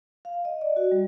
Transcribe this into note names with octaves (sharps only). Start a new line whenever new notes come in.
F5
D#5
D5
F#4
G3